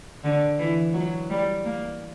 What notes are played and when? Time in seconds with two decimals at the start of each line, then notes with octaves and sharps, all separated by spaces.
0.24 D3
0.59 E3
0.93 F#3
1.30 G3
1.65 A#3